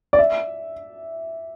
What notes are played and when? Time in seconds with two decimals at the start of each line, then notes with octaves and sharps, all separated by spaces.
0.13 D5
0.19 E5